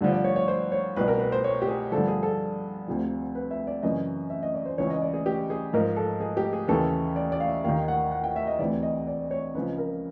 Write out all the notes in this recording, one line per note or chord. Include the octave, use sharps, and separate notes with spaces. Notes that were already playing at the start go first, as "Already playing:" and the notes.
G2 D3 F3
D5
C#5
C#5
C5
C#5
C2 B2 B4
A#4
B4
C5
C#5
G4
G#4
G2 D3 F3 A4
G#4
A4
D2 C3 F3
B4
E5
D5
F#2 C#3 E3 D#5
E5
D#5
D5
C5
C#2 C#3 E3 C#5
D#5
D5
G#4
G4
G#4
G#2 F3 A#4
A4
G#4
G4
G#4
D#2 C#3 E3 A4
D5
D5
F5
E5
D#2 D#3 F5
F#5
F#5
G5
E5
D#5
D2 C3 E3 D5
D#5
D5
C#5
C#2 C#3 F3 B4
A#4